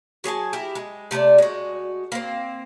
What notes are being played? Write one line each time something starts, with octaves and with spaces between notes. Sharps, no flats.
F#3 G#4 G#5 A5
E4 G4 A#4
G#3
C3 A3 D4 D5
G#3 F#4
A#3 C4